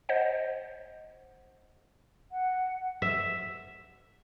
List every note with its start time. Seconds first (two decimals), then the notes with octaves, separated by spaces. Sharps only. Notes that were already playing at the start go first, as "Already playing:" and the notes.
0.09 C5 D#5 F#5
2.32 F#5
3.02 E5